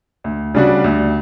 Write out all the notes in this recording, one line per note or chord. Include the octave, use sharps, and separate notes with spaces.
D2
C#3 G3 D4 F#4
D2